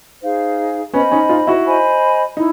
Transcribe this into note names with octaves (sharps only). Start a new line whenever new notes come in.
D#4 G#4 C5 F5
B3 C#4 C5 D#5 G#5 B5
C#4 D#4
D#4 F4
E4 F#4
C5 D#5 G#5 B5
D#4 E4